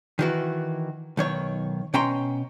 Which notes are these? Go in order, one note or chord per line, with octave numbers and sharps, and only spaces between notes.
D#3 E3 F#4
B1 D#3 C#5
B2 C#4 G5 A#5 C6